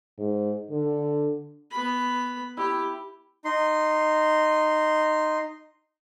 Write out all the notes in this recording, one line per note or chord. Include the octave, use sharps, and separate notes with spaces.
G#2
D3
B3 B5
E4 G4
D#4 C6